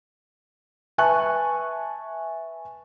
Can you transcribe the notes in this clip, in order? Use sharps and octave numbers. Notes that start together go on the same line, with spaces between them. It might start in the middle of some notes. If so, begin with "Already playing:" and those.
B4 E5 G#5 A5 C#6 F#6